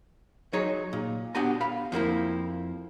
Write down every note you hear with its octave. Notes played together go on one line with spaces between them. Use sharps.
F#3 D#4 G#4 C#5
A#2
B3 D4 F#4 G4 G#5 A#5
F5 B5
F2 F3 A#3 E4